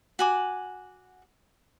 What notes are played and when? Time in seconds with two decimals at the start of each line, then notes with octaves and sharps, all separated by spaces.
0.19 F#4 G#5 D6